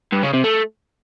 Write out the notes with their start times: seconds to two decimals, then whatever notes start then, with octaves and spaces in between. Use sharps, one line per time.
0.13 G2
0.23 C#3
0.34 C3
0.44 A3